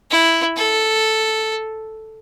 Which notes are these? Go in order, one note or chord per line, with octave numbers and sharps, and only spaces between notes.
E4
A4